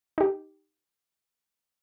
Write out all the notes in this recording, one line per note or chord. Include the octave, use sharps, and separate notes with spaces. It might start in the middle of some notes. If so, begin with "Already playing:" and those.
D#4 G4